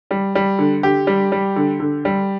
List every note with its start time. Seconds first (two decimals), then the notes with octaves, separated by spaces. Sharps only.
0.11 G3
0.35 G3
0.59 D3
0.83 D3 G4
1.07 G3
1.32 G3
1.56 D3
1.80 D3
2.05 G3